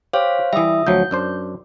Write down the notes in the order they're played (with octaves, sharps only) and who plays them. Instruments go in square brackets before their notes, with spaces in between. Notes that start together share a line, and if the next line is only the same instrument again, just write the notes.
[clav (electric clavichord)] G4 [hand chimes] C5 C#5 F5
[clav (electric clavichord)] E3 G3 [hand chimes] E5 D#6
[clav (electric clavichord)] D2 F3 F#3 [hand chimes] G6
[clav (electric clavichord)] F#2 D4 C5